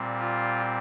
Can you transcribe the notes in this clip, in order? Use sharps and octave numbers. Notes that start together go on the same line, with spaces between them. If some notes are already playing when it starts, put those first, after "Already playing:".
Already playing: A#2 G3 C4
F4